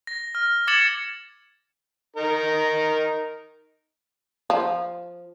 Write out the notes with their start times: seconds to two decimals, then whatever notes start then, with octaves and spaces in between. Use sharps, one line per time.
0.07 A#6
0.35 F6
0.67 D6 G#6 A6 C#7 E7 F#7
2.16 D#4 A#4
4.50 F3